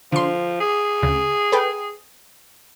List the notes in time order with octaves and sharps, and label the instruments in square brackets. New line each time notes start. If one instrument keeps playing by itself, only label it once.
[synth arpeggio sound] D3 C6 [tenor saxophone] F3
[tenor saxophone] G#4
[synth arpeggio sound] D2 C#3
A4 B4 G5